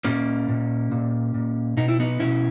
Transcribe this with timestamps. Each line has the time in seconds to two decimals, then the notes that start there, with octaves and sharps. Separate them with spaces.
0.04 A#2 A#3 C#4
0.48 A#2
0.92 A#2
1.34 A#2
1.77 B2 D#4
1.88 E4
2.00 B3 D#4
2.20 B2 C#4 E4